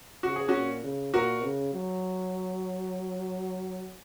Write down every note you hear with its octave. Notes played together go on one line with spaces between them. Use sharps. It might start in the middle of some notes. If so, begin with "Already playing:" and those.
C#3 F#4
G#4
C#4 F#4
A#2
C#3
A#2 F#4 A#4
C#3
F#3